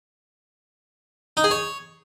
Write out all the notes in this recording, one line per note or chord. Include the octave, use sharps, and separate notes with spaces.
D#4
G#4
C#5